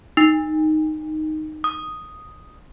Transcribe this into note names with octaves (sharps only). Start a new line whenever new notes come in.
D#4
D#6